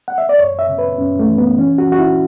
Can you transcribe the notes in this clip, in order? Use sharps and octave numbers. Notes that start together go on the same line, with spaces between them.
F#5
E5
D5
F#2 C#5
E5
C#3
B4
F#2 C#4
A3
E3
B3
E3 C#4
F#4
E3 F#4
E4